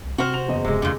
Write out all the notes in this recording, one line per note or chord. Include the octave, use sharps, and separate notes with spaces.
C2
C3 C4 F#4 C5 F#5 F6
F7
F#1 E2 D#5
D1 C3 G#3
E2 A#2 D3